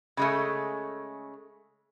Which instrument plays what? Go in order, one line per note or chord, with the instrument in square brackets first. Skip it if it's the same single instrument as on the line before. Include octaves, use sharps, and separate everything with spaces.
[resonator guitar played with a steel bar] C#3 G#3 A3